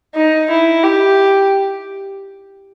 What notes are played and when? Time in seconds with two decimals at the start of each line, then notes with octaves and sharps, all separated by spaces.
0.15 D#4
0.50 E4
0.84 G4